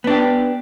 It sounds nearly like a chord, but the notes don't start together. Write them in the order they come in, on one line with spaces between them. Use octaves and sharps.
B3 D4 G4